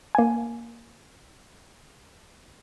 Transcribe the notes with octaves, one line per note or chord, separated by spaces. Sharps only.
A#3 G#5